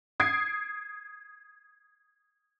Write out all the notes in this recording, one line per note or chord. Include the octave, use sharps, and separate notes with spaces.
D#6 G#6 C7 D7